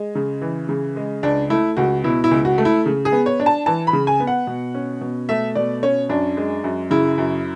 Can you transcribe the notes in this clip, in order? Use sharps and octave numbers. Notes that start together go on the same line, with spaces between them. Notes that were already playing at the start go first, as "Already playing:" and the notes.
Already playing: G#3
C#3
E3
C#3
G#3
C#2 D4
A3 E4
C#2 F#4
B2 E4
E4
C#2
F#4
A3
E4
C#3
G#4
B3
C#5
D4
A5
E3 A5
B5
C#3
G#5
B3
F#5
B2
C#4
B2
A3 E5
B2 D5
C#4 C#5
F#2 D4
G#3
F#2
C#3 E4
F#2